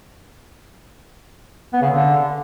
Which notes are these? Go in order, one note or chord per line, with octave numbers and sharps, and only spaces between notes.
B3
C#3
D3